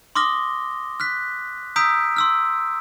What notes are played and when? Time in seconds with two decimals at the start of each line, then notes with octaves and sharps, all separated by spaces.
0.15 C6 D6 D#6 F6 A#6 G7
1.00 F6 F#6 B6
1.76 A#5 D#6 E6 G6 B6 D7
2.16 C6 E6 F6